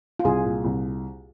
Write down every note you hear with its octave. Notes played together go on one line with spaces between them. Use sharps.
F4
C2 G#4
A#2
C2